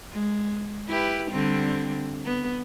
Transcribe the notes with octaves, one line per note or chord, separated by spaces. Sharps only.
G#3
E4 G4 B4
D3 G3 C4
B3